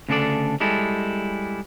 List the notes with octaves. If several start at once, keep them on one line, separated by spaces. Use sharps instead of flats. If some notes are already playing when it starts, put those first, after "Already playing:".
D2 C#3 D4 F4 A4 D5
G3 G#3 E4 A4